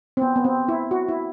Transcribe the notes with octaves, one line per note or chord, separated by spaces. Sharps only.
C4
B3
B3
C4
E4
F#4
E4